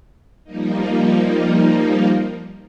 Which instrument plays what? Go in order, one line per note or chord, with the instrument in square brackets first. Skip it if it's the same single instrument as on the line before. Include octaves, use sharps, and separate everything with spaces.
[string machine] F3 G3 A#3 D#4